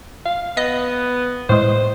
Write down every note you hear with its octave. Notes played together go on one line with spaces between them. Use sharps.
F5
B3 D#5
A2 G#3 C5